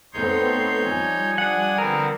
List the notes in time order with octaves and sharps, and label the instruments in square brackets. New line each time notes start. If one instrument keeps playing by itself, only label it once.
[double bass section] A3 B3 C4 [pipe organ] D#4 C#5 G6 [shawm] C6
[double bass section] F3 G3 [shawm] G#5
[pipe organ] D4 D#6 [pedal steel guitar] F#5
[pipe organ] D3 B3 C4 [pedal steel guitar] A#4